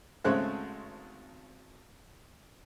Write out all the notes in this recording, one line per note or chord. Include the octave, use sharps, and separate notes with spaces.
G#1 C#3 G#3 A3 C5 F#6